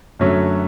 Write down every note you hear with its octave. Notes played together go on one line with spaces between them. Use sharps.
F#2 D3 F#3 A3 C#4